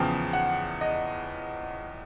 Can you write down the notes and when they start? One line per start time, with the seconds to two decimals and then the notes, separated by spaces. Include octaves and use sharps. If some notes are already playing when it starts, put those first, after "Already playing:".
Already playing: E2 C#3 F3 G5
0.33 F#5
0.81 D#5